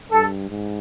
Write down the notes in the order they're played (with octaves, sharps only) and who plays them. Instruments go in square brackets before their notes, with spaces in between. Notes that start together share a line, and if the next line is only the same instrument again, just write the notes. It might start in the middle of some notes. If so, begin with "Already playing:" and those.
[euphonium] G2 [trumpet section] A4
[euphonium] G#2